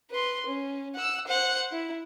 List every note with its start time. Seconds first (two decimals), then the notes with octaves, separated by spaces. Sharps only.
0.11 B4 C6
0.46 C#4
0.95 F#5 E6
1.27 C5 F#5
1.72 E4